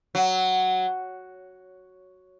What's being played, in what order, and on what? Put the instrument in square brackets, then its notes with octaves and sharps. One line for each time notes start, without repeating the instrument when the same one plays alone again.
[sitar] F#3